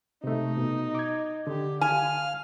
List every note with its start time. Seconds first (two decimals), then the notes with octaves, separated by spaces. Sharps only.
0.24 C3 A3 D#4
0.57 B2
0.95 D6 G#6
1.47 D3 G4
1.81 F5 G#5 F6